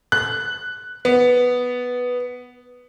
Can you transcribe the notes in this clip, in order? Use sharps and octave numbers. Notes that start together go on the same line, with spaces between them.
F#6
B3